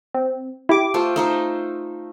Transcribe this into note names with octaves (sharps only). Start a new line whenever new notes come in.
C4
E4 G4 D6
A3 F4 C5
A3 D#4 C5